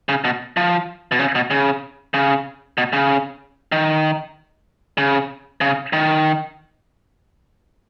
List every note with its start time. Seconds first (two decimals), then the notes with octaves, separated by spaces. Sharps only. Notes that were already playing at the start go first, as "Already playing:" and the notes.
0.09 C#3
0.24 B2
0.57 F3
1.12 B2
1.19 C#3
1.35 B2
1.51 C#3
2.14 C#3
2.78 B2
2.93 C#3
3.72 D#3
4.98 C#3
5.61 C#3
5.93 D#3